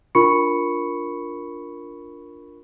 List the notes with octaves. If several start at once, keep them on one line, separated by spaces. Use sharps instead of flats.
D4 F4 A#4 B5 C#6 C#7